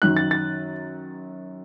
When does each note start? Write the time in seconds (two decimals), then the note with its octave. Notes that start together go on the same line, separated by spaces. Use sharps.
0.02 F#2 D#3 F#6
0.17 A6
0.31 A6